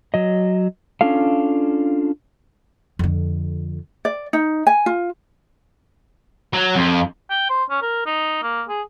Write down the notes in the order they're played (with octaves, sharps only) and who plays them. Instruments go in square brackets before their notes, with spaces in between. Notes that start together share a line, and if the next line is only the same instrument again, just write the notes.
[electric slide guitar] F#3 D#5
C#4 D4 F4 A4 F5
[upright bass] F2 D3
[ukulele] D5
D#4
G#5
F4
[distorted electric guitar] F#3
F2
[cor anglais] G5
C5
C#4
A#4
D#4
A#3
G#4